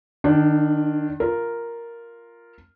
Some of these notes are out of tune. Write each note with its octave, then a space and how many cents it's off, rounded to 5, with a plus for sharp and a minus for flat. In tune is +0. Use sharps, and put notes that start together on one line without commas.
D#3 -25 D4 +5
F4 +0 A#4 +0